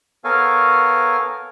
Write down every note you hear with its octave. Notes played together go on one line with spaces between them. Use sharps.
B3 A4 A#4 C#5 F5 G#5